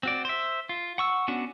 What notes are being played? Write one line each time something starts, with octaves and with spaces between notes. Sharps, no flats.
C4 F#4 D5
C5 E5
F4
F#5 C#6 E6
B3 C#4 D4 F#4